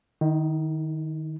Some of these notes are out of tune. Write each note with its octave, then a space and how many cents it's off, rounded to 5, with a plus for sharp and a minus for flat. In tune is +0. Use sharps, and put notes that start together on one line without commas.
D#3 -15 D#4 +45